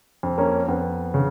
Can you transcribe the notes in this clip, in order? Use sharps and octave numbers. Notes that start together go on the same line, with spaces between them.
F2
A#3 C#4
F2 B3
C#3